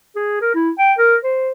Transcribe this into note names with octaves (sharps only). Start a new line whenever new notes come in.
G#4
A#4
E4
G5
A#4
C5